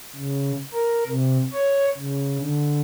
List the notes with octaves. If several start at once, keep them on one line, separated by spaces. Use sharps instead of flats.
C#3
A#4
C3
C#5
C#3
D3